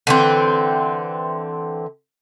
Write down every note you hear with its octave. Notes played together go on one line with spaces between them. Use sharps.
D3 E3 C4